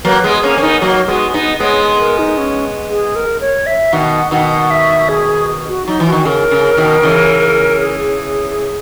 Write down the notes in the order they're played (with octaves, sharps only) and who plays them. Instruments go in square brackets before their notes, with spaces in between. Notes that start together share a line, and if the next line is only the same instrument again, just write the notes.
[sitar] F#3 A#3 [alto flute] B4
[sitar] G#3 B3
[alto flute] G#4
[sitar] A#3 C#4
[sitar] C#4 [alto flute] A#4
[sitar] B3 D#4
[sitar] F#3 A#3 [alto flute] F#4
[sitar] G#3 B3 [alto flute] F#4
[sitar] B3 D#4 [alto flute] D#5
[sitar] G#3 B3 [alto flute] C#5
[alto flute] A#4
D#4
C#4
G#4
A#4
C#5
E5
[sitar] B2 D#3 [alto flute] F#5
[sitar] B2 D#3 [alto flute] F#5
[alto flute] E5
G#4
F#4
[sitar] F#3 [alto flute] D#4
[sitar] E3
[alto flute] F#4
[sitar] D#3
[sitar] C#3 [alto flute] A#4
[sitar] C#3
B2 D#3
C#3 E3
[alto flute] G#4